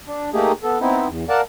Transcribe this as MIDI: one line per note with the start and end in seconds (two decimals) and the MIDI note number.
0.07 0.30 62
0.34 0.52 57
0.34 0.52 58
0.34 0.52 63
0.34 0.52 67
0.34 0.52 68
0.63 0.78 59
0.63 0.78 69
0.81 1.07 59
0.81 1.07 60
0.81 1.07 63
0.81 1.07 64
1.08 1.24 40
1.29 1.41 70
1.29 1.41 74
1.29 1.41 77
1.29 1.41 78
1.29 1.41 81